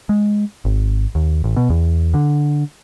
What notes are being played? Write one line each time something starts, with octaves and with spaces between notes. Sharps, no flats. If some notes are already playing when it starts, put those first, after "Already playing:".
G#3
G#1
D#2
A1
B2
E2
D3